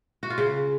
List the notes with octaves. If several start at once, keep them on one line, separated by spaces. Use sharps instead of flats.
F#4
F4
C#3